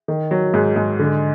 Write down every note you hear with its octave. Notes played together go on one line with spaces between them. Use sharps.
D#3
F#3
G#2
G#2
D3